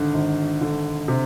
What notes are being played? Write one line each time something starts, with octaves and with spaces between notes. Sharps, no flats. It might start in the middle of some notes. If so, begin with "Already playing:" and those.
Already playing: G#1 D3
G#1
D3
C3